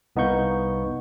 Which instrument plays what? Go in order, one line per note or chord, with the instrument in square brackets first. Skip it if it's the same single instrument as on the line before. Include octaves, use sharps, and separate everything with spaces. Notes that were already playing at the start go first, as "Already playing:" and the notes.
[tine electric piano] C2 B3 D#4 F5 C#6 G6